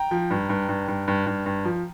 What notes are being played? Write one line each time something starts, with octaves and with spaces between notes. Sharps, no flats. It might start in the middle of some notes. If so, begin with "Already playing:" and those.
Already playing: G5 A#5
F3
G2
G2
G2
G2
G2
G2
G2
F3